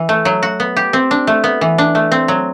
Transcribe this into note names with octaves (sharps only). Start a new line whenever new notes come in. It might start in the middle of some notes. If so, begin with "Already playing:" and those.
Already playing: E3
A3
F#3
F#4
B3
G4
C4
D4
A3
B3
E3
D4
A3
C4
F#3